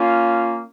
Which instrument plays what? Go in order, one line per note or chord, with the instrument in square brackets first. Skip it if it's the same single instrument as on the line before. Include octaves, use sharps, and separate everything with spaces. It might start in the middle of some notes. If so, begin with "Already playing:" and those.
Already playing: [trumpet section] A#3 C#4 F4